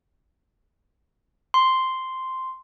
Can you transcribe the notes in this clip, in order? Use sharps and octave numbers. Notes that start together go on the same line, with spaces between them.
C6